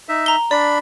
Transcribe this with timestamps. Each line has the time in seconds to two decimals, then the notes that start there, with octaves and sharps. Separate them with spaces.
0.09 D#4 E5
0.26 A#5 G7
0.51 D4 D5 B5